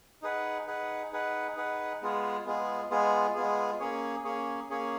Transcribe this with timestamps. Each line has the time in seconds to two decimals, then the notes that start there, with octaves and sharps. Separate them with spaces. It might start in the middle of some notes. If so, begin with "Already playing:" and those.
0.22 D#4 G#4 B4 F#5
0.67 D#4 G#4 B4 F#5
1.12 D#4 G#4 B4 F#5
1.57 D#4 G#4 B4 F#5
2.02 G#3 B3 F4 G#4
2.46 G#3 B3 F4 G#4
2.90 G#3 B3 F4 G#4
3.35 G#3 B3 F4 G#4
3.79 A#3 C#4 G#4 C#5
4.24 A#3 C#4 G#4 C#5
4.69 A#3 C#4 G#4 C#5